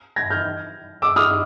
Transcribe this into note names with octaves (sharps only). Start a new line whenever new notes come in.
G#6 A#6
F6 G6
D6 E6
D#6 F6